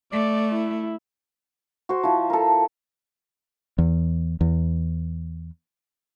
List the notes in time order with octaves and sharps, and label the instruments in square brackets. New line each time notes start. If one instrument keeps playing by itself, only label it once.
[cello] A3 [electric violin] D5
[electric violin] E4
[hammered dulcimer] F#4 C5
F3 E4
A4 A#4
[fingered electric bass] E2
E2